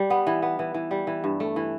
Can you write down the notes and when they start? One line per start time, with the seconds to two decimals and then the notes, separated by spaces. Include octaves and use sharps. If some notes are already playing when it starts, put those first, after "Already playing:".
Already playing: G3
0.10 B3
0.27 E3
0.42 B3
0.59 E3
0.74 E3
0.91 G3
1.07 E3
1.24 G2
1.40 A3
1.56 E3